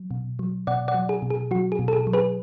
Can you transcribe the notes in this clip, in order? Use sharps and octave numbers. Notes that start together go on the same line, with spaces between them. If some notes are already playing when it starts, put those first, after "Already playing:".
Already playing: F#3
B2
F#3
B2 D5 F#5
D5 F#5
F#3
G#4
B2
G#4
F#3 F#4
G#4
B2
A4
G#4
F#3
G#4 B4